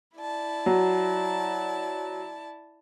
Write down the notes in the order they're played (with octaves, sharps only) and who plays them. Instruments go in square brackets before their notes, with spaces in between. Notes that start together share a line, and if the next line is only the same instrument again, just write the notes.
[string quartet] E4 D5 A5
[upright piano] F#3